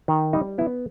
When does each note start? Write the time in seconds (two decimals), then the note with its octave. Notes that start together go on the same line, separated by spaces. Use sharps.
0.08 D#3
0.33 G3 D#4
0.58 B3 E4